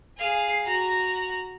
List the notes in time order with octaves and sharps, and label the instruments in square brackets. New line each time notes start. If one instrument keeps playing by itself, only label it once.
[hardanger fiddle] G#4 F5
F#4 A#5